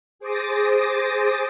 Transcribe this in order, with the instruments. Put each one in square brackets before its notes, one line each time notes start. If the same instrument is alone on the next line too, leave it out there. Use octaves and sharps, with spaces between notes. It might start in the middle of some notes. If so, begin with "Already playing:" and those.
[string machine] G#4 C5 D6 D#6 A6 A#6